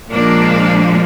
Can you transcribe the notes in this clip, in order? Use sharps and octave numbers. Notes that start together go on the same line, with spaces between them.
A#2 F3 G#3 A#3 D4